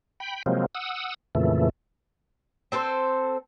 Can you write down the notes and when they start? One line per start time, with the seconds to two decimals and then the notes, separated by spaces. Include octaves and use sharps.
0.20 G5 B5
0.46 C3 F3 F#3 G#3 A#3 C4
0.75 F#5 D#6 E6
1.35 F2 A#2 C#3 E3 A3
2.72 C4 A4 A#4 C5